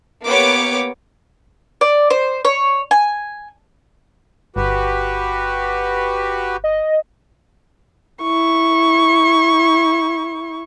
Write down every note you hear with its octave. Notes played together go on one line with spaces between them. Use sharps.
A#3 B3 G4 C#5 D6
D5
C5
C#5
G#5
G1 F#4 G4 B4
D#5
E4 C#6